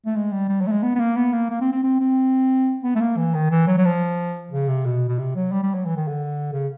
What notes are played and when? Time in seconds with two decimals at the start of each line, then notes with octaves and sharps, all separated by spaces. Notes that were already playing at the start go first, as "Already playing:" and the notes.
0.06 A3
0.16 G#3
0.32 G3
0.49 G3
0.61 F#3
0.67 A3
0.71 G#3
0.83 B3
0.95 B3
0.99 A#3
1.16 B3
1.33 A#3
1.50 A#3
1.61 C4
1.72 C4
1.83 C4
2.00 C4
2.83 B3
2.95 A3
3.01 A#3
3.17 E3
3.34 D#3
3.51 E3
3.67 F#3
3.77 F#3
3.85 F3
4.51 C#3
4.68 C3
4.85 B2
5.08 B2
5.19 C3
5.36 F#3
5.52 G3
5.63 G3
5.74 F#3
5.86 E3
5.97 D#3
6.08 D3
6.53 C#3